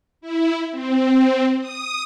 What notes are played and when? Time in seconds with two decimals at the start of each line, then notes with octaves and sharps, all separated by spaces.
0.21 E4
0.71 C4
1.60 D#6